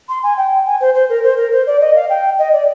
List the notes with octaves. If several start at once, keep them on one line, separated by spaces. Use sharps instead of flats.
C6
G#5
G5
G#5
C5
C5
A#4
C5
A#4
C5
D5
D#5
F5
G5
D#5
D5